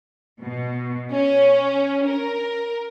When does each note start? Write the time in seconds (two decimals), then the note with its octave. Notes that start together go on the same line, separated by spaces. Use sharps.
0.39 B2
1.12 C#4
2.08 A#4